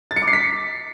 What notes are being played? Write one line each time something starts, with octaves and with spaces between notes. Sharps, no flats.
A6
C#7
D6
C7
B6